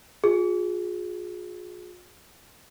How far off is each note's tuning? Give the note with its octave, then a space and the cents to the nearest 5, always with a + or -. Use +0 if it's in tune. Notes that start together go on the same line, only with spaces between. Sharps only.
F4 +40 G#4 +0